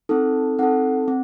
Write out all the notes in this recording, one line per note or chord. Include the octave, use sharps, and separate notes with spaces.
C4 D#4 A4
C4 D#4 A4 F#5
C4